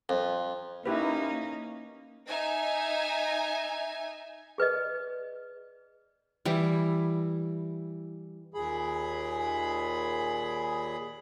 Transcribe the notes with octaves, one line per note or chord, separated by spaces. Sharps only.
F2
A#3 C#4 D#4 E4 G4 B4
D#4 E5 G#5
G#4 B4 D5 D#5
E3 G3 E4
D#2 A#2 G#4 B5